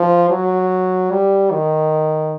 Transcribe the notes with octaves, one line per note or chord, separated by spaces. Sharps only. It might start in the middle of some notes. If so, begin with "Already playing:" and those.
Already playing: F3
F#3
G3
D#3